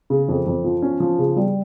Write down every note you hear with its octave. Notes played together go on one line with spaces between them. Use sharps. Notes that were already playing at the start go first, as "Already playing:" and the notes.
C#3
F2
F2
F3
C#4
F3
C#3
G3